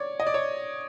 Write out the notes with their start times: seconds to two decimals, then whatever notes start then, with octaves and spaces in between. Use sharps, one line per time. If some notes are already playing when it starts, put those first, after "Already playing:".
Already playing: C#5 D5
0.20 D#5
0.27 D5
0.34 C#5